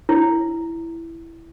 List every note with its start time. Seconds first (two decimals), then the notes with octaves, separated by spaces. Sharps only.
0.09 E4